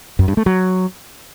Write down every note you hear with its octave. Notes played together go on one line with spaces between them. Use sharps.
F#2
G2
A3
F#3